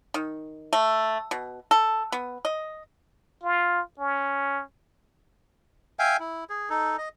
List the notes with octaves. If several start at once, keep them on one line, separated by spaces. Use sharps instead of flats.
D#3
A3
B2
A4
B3
D#5
F4
C#4
E5 F5 G5 G#5
E4
G#4
D#4 A4
D#5